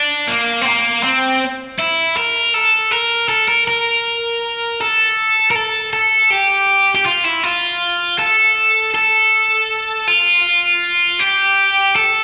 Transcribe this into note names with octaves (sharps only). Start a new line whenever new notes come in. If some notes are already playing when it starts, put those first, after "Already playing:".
Already playing: D4
A#3
C4
A#3
C4
E4
A#4
A4
A#4
A4
A#4
A#4
A4
A#4
A4
A4
G4
G4
F4
E4
F4
A4
A4
F4
G4
A4